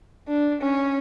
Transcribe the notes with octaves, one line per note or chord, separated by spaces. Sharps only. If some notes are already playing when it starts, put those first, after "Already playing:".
D4
C#4